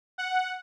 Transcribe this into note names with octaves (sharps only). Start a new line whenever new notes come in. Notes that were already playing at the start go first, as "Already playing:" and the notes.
F#5